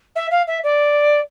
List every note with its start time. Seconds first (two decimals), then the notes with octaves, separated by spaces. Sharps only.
0.16 E5
0.31 F5
0.47 E5
0.64 D5